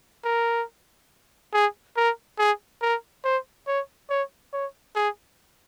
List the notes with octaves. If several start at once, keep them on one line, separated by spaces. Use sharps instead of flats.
A#4
G#4
A#4
G#4
A#4
C5
C#5
C#5
C#5
G#4